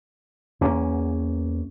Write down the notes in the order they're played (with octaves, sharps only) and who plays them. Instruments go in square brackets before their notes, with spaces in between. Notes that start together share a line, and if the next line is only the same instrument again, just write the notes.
[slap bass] E2 A#3 C#4